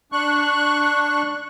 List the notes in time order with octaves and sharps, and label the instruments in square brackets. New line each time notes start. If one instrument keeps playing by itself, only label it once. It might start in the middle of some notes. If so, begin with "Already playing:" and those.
[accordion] D4 C#6 F#6